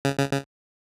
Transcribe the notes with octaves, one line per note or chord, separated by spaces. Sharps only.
C#3
C#3
C#3